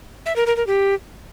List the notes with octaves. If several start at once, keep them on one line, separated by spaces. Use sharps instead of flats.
E5
A#4
A#4
A#4
G4